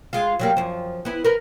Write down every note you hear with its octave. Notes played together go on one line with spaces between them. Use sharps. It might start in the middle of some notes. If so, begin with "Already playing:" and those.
G#3 F4
F#3 G3 A#3
F#2 F3
B3 E4
A#4 B4